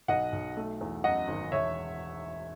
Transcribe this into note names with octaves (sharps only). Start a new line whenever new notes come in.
B1 D#5 F#5
B1
A3
E2
F#2 D#5 F#5
G#1
E1 C#5 E5